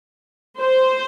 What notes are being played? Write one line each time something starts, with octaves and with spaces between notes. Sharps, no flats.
C5